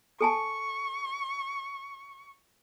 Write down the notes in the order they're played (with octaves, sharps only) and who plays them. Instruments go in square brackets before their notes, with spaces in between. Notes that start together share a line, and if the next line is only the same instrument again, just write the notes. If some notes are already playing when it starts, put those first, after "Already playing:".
[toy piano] A4 G#5 A5 [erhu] C#6